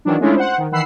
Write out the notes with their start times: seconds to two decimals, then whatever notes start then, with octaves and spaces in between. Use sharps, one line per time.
0.05 D#3 E3 F#3 D4
0.20 G#3 A3 C#4 D4 E4 F4
0.35 C5 F#5
0.58 D#3
0.72 D#3 E3 F#5 B5 E6 C7